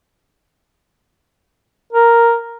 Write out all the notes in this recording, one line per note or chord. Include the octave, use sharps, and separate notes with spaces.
A#4